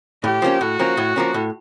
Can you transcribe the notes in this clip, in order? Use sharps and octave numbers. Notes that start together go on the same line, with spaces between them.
A2 G4
F3 A#3 C#4
A2 F#4
F3 A#3 C#4
A2
F3 A#3 C#4
A2